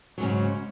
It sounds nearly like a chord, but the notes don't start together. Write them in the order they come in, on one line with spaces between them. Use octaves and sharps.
F#3 G#2 C#3